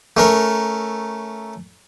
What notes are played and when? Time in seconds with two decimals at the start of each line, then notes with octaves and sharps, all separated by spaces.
0.17 A3 C#4 A#4